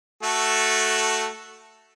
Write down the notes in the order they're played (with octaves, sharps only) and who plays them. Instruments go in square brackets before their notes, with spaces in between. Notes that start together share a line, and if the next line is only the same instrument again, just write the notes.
[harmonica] A3 F#4 A4